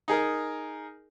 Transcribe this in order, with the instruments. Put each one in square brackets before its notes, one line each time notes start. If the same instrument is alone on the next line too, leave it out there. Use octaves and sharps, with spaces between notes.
[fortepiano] D#4 G#4 A#4